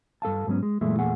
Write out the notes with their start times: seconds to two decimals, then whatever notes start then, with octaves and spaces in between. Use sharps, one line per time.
0.22 G2 A4 F5 A5
0.47 G#2 F#3 B3 C#4
0.63 G#3
0.81 F#2 A#2 E3 G#3 A3 E4
0.99 E2 A#2 A3 G#4 F#5